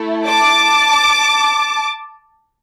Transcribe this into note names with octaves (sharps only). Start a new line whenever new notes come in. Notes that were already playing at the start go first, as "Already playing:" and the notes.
Already playing: A3 E4 A4
A5 D6